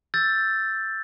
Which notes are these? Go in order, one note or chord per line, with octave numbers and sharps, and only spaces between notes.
E6 G6 A6